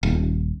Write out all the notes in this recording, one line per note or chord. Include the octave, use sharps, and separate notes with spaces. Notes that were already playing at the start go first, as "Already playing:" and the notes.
D#1